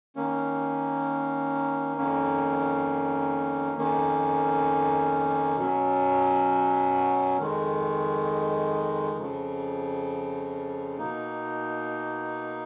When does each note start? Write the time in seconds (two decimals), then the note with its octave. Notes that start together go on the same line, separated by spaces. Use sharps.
0.16 D#3 A#3 C#4
1.97 F2 D#3 A#3 C#4
3.77 F2 D#3 A#3 C#4
5.57 B2 F#3 C#4
7.37 F2 D#3 G#3
9.17 F2 C#3 F3
10.98 B2 A#3 D#4